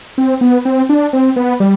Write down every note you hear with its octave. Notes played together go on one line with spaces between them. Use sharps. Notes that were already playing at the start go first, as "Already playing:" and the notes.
C4
B3
C4
D4
C4
B3
G3